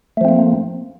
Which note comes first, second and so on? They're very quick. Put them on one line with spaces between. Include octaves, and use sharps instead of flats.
A3 F3 C4 A#3